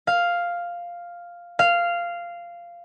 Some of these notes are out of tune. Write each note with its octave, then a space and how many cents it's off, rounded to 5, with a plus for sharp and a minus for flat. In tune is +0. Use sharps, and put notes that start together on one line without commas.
F5 +0
F5 -10